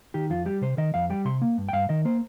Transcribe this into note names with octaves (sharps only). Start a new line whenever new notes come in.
D#3 G4
F2 F4
G3 G4
C3 C5
D#3 D#5
F2 F5
G3 G5
C3 C6
A#3
G2
G5
G2 F5
D#3 D#5
A#3 C5